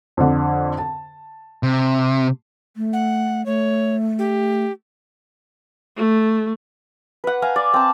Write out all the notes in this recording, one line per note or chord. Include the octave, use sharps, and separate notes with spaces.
F2 D3
A5
C3
A3
F#5
A3 C#5
G4
A3
B4 F#5
F5 G#5 A#5
D5
C4 A5